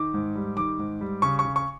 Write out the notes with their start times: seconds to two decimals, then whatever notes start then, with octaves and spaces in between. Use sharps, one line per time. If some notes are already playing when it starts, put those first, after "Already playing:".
Already playing: D#3 D6
0.14 G#2
0.36 G3
0.57 D#3 D6
0.79 G#2
1.01 G3
1.22 C#3 C#6
1.39 C#6
1.45 C#3
1.56 C#6